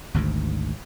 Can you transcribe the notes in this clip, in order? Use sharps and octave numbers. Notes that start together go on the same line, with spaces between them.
G#1 D2 G#2